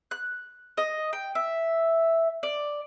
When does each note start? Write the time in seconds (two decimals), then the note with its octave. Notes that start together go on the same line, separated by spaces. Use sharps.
0.11 F#6
0.77 D#5
1.13 G5
1.35 E5
2.43 D5